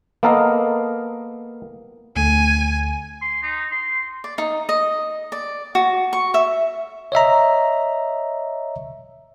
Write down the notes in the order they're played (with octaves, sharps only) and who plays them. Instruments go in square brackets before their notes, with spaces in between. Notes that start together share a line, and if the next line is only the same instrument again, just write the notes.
[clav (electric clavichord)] A#3 B3 A4 A#4 D#5 F5
[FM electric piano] D2 D3 A3 [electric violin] G#5
[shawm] C6
D#4
C6
[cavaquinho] D5
D#4
D#5
D5
F#4
C#6
E5
[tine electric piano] C#5 D#5 E5 A#5